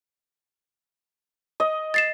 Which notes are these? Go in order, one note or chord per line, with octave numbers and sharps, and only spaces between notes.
D#5
A6 C7 E7